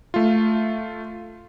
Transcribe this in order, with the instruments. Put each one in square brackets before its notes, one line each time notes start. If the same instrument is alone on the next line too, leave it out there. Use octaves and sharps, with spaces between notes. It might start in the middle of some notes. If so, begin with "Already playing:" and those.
[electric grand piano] A3 F4